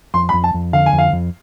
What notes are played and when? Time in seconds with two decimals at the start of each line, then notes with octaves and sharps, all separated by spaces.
0.14 F2 C6
0.29 B5
0.33 F2
0.44 A5
0.54 F2
0.73 D3 F5
0.86 G#5
0.93 F2
0.98 F5
1.13 F2